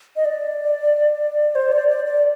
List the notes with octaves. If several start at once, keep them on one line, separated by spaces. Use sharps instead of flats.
D#5
D5
C5
D5
D5
D5